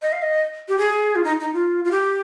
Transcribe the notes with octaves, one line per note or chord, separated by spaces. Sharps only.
D#5
F5
D#5
G4
G#4
F4
D#4
D#4
F4
F4
G4